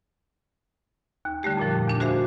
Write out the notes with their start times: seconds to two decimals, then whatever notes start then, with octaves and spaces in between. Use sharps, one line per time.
1.25 D#2
1.43 D3 G3 A3 G4
1.57 F2 A#2 F3
1.88 E2 D4 D6
2.00 F#4 G#4 C5 E5 F5